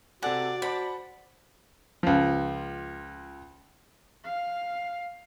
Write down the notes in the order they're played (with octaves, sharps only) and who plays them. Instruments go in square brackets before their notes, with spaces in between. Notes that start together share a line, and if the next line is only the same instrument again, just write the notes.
[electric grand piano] C3 A4 G#5 [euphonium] F#4 [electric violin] D5 [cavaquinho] F#5
[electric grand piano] C5 F#5 A5 [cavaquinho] B5
[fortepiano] C#2 F3
[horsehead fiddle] F5